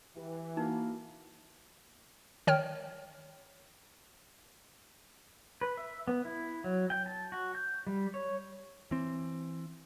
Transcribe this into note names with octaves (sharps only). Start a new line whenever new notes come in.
E3 G4
A#3 D#4 E4 F#4 A#4
D#3 C#5 G5 F6
B4
E5
B3
E4
F#3
G5
A5
F#4
G6
G3
C#5
E3 C4